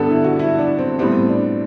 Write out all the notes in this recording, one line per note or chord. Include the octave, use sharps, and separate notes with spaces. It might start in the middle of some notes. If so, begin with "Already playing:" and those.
Already playing: G2 D3 G3 B3 A4 B4
E4
F#4
E4
D4
C4
A2 G3 B3 C4
D4